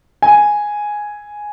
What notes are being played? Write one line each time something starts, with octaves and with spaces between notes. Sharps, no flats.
G#5